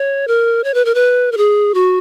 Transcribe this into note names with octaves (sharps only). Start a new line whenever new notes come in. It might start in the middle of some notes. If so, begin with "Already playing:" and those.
Already playing: C#5
A#4
C#5
B4
A#4
B4
A#4
G#4
F#4